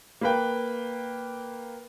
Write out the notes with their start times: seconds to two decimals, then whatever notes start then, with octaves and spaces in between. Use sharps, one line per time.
0.21 A#3 B4 G5